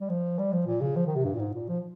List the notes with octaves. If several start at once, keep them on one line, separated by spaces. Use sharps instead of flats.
G3
F3
G3
F3
A#2
C#3
F3
D#3
C3
G2
A#2
G#2
A#2
F3